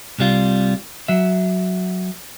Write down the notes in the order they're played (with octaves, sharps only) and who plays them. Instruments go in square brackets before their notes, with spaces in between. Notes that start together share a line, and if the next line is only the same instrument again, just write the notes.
[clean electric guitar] C2 C3 G3 F4
F#3 E5